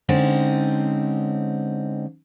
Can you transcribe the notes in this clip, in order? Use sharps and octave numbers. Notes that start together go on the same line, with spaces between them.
D3 G#3 C4 C#4 D#4